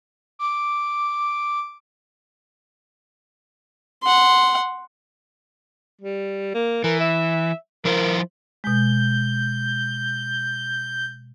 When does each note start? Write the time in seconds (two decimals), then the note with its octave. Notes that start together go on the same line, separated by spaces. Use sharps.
0.39 D6
4.03 F#5 C6
6.01 G3
6.54 A#3
6.84 E3 A#4
7.00 E5
7.85 F3 E4 A#4 C5
8.64 B2 G#3 G6